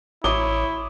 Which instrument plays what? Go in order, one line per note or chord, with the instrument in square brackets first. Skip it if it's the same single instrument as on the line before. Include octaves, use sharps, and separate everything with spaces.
[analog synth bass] A1 [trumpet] E4 [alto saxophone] C#5 [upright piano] D6 D#6 G7